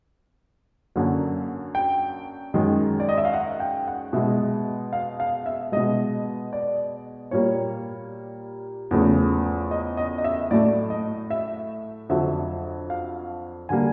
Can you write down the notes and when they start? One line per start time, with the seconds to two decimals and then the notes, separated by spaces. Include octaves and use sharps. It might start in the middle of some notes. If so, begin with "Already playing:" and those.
0.96 F#2 D3 F#3 A#3
1.75 G5
2.54 F#2 D#3 G#3
3.00 D5
3.09 D#5
3.18 E5
3.25 F5
3.33 F#5
3.60 G5
3.88 F#5
4.13 B2 G#3 E5
4.93 F5
5.20 F5
5.46 E5
5.72 B2 G#3 D#5
6.53 D5
7.31 A#2 G3 A#3 C#5
8.91 E2 C#3 F3 A3
9.71 D#5
9.97 D#5
10.18 D#5
10.24 E5
10.51 A2 F#3 A3 D5
10.90 D#5
11.31 E5
12.09 F2 D3 F#3 E5
12.90 F5
13.69 D3 G3 A#3 G#5